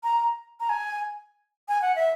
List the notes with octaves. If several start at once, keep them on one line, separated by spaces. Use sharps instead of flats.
A#5
A#5
G#5
G#5
F#5
E5